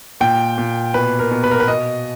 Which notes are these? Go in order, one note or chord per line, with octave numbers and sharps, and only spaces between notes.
A#2 G5
A#2
B2 B4
A#4
B2
B4
A#4
B4
B2 D#5